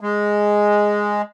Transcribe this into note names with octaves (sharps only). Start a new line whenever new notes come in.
G#3